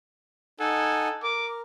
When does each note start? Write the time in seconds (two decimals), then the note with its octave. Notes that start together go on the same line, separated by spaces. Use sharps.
0.60 D#4 A4 F#5 G#5
1.23 A#4 D6